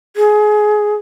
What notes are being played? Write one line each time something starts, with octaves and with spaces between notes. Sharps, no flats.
G#4